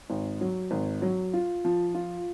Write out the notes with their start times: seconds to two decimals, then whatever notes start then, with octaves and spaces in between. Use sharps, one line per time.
0.10 G#1
0.41 F#3
0.71 G#1
1.02 F#3
1.34 F4
1.65 F3
1.95 F4